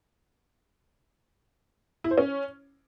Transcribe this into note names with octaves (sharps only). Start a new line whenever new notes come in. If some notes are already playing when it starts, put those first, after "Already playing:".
E4
C5
C#4